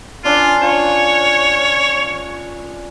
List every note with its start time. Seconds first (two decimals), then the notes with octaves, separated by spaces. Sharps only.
0.24 C#4 D4 F4 B4
0.62 F4 C#5